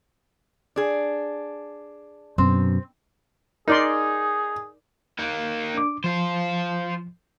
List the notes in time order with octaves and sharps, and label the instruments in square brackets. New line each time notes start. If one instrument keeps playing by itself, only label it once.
[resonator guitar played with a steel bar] D4 G#4
[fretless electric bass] F#2 B2 [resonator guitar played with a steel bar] C4
[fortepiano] D#4 [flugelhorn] G#4 [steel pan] A#4 D5 C6
[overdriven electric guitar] A#3 D#4
[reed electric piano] D4 D6
[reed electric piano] F3 [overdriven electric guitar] F4 C5